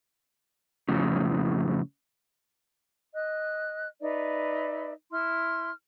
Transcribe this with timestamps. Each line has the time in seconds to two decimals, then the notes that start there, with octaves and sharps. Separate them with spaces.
0.88 F2 A2 C#3
3.14 D#5 F#6
4.02 D#4 B4 D5 E5
5.11 E4 C6 F6